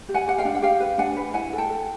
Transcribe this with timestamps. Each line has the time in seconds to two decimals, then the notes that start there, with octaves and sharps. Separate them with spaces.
0.09 G4
0.14 F#5 G#5
0.28 G4 F#5
0.38 F5 G5
0.45 D4
0.55 F#5
0.62 G4 F5 G5
0.80 B4
0.98 D4 F#5 G#5
1.16 B4
1.34 E4 F#5 G#5
1.53 A4
1.58 G5 A5
1.70 A4